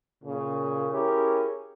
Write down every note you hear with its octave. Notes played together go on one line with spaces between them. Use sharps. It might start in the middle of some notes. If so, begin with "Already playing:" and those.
A#2 C#3
C#4 E4 G4 G#4 A#4